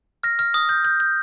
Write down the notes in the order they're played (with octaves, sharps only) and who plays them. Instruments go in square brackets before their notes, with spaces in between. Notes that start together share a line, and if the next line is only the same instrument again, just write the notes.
[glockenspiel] F6 A#6
F6
D#6
G6
G6
G6